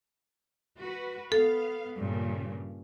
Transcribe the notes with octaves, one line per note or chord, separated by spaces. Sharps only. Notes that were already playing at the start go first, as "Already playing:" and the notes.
F#4 B4
B3 A4 F5
G2 A#2 C#3